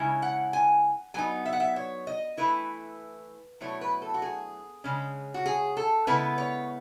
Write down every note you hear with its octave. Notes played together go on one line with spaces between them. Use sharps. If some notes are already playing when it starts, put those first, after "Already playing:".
Already playing: C#3 G#3 C#4 E4
F#5
G#5
F#3 B3 D#4 G#5
E5
F#5
E5
C#5
D#5
E3 A3 E4 B4
B2 F#3 A3 E4 C#5
B4
A4
F#4
G#4
C#3 G#3 C#4
F#4
G#4
A4
C#3 G#3 B3 E4 B4
C#5